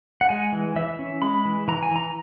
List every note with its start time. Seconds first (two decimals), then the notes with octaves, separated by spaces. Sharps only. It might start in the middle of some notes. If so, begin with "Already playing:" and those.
0.21 F#5
0.29 G#3 G#5
0.52 E3
0.76 E3 E5
0.99 C#4
1.22 G#3 B5
1.45 E3
1.68 E3 A#5
1.83 G#5
1.91 E3 A#5